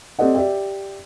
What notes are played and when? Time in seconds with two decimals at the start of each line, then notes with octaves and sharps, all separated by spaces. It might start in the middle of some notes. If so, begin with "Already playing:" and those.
0.19 C4 G4 A4 D5 D#5 F#5
0.34 G4 D5 E5 G5